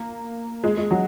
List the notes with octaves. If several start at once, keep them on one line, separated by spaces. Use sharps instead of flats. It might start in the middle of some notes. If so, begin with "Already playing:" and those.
Already playing: A#3
G#3
G#3
F#3